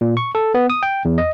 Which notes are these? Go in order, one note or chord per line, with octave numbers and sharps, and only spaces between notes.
A#2
C#6
A4
B3
D#6
G5
E2
D#5